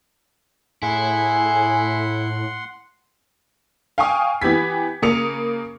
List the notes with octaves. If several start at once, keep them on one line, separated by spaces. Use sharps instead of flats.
A2 E4 G#4 F#5 C6
F5 G5 G#5 C#6 D#6
E3 B3 G4 G#6 B6
C#3 A#3 D#6 C#7 F7